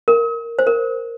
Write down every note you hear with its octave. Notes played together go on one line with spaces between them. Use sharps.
A#4
C5
A#4